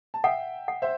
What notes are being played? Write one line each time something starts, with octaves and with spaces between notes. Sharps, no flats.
A5
E5 F#5 G5
F#5
C5 E5